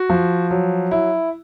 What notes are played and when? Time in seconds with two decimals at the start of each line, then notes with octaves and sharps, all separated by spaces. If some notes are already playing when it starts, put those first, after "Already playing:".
Already playing: F#4
0.10 F3
0.51 F#3
0.91 E4